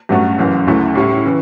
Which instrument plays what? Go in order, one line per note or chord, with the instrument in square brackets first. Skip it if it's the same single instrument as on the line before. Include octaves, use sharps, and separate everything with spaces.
[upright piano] G2 F#3 A3 C#4 F#4
F#1 F#2 E3
D2 C#3 F#3 A3 E4
A2 G3 C#4 E4
C#3 E3